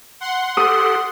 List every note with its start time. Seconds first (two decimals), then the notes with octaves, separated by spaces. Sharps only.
0.21 F#5 C6
0.57 G4 A4 D#6